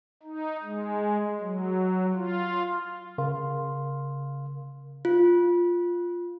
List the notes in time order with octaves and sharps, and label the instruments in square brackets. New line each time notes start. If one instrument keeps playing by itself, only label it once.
[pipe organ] D#4
G#3
F#3
F4
[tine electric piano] C#3 A#4 F5 C6
[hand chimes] F4